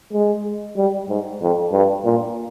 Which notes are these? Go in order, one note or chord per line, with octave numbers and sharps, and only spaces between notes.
G#3
G3
G#2
F2
G2
A#2